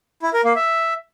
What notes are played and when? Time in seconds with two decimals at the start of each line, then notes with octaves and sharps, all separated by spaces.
0.22 E4
0.33 A#4
0.45 A#3
0.56 E5